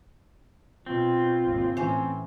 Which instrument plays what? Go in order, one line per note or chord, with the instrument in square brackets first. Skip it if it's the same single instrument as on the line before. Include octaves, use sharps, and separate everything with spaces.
[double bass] B2 [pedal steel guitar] C4 [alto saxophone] F4
[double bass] G#1 D#2
[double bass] A2 E3 [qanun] C#4 C5